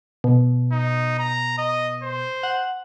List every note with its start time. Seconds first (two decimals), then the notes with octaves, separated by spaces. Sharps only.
0.24 B2
0.72 D#4
1.19 A#5
1.58 D#5
2.03 C5
2.43 F#5